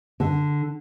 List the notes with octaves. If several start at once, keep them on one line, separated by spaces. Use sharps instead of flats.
D3